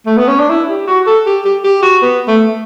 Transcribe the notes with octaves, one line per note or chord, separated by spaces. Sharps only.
A3
B3
C#4
D4
E4
G4
F#4
A4
G4
G4
G4
F#4
B3
A3